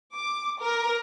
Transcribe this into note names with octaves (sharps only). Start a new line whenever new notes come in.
D6
A#4